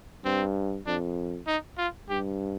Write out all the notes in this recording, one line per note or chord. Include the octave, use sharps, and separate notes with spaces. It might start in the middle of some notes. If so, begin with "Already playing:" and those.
G2 C4
F2 D4
D#4
F4
G2 G4